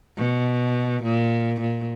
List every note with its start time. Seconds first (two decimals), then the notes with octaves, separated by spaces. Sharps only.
0.17 B2
1.03 A#2
1.61 A#2